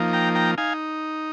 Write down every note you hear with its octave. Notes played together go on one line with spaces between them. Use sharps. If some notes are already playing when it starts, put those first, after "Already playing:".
Already playing: F3 A#3 D#4
G5 A#5
G5 A#5
D#4 F5 G#5